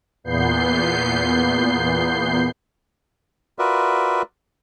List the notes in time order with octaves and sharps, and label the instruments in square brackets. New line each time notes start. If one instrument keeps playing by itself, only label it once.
[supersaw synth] E2 A#2 B3 G6 C7
[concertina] F4 F#4 A#4 B4 D5 E5